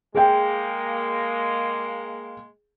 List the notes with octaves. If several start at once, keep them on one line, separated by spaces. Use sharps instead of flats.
G#3 A#3 G#4 G5